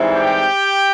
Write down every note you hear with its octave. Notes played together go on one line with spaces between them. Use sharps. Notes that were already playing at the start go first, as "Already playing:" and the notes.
Already playing: G#2 E3 G3 C4 E4
G4 G5